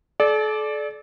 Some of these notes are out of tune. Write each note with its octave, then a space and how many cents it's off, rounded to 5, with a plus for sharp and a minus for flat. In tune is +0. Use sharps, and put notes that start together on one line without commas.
A4 -40 D5 +0